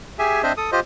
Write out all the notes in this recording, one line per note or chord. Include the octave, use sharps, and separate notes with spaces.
G4 G#4 E5 G#5
C4 D4 C5 D#5 E5
A4 D#6
F4 G4 C5 D#5